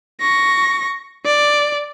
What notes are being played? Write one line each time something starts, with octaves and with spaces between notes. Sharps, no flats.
C#6 A#6
D5